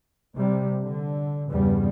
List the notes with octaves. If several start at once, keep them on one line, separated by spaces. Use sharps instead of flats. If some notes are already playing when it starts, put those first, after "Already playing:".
C3 G3
D3
E2 G2 C#3 G3 B3